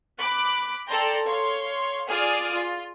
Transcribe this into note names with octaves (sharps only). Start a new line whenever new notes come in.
B5 D6 F#6
A4 D5 G5 A5 A#5 C6
C#5 F5 C6
F4 G#4 D5 D#6 F6
F4